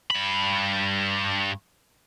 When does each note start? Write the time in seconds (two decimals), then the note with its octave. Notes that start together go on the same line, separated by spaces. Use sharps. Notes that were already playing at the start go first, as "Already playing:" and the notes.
0.11 G2 B5